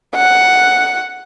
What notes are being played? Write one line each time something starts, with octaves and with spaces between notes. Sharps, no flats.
F#5